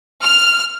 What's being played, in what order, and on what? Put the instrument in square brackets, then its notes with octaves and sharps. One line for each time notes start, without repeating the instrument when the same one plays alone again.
[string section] F6